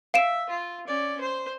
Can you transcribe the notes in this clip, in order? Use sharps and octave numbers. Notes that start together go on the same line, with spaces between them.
E5 F5 D7 E7
F4
C#4 D5
C5